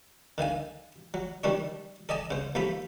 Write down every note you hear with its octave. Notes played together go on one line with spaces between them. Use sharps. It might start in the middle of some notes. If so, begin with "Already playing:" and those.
D3 D#3 F5 G#5
F#3
D#3 G3 D4 C#5
A4 D5 D#5 G#5 A5
C#3 C5
D#2 F3 F4 A4 B5